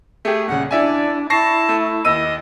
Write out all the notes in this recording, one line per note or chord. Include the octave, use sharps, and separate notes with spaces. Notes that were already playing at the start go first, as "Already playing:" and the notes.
A3 G4 G#4
D#1 C#3 F#5
D4 E4 D5 E5 G#5
E4 A5 C#6 A#6 C7
A3
D#2 D#5 E6 D#7